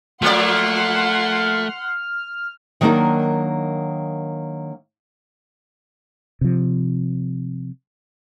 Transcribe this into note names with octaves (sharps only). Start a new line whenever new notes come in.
F3 A3 A#3 D5 F#5 C6 F6
D#3 F#3 A#3 D4 D#4 A#4
C3 F3